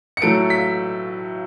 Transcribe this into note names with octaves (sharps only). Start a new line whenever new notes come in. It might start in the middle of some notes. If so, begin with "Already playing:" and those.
C#7
A2 F#3 A3 D7
B6